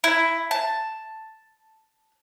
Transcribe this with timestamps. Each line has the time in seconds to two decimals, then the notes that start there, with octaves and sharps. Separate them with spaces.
0.04 E4
0.51 A5